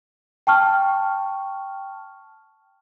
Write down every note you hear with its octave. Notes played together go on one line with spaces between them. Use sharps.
G5 A5 C#6 F6